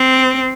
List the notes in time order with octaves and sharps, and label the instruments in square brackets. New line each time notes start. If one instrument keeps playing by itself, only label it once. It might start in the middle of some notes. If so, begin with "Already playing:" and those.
Already playing: [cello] C4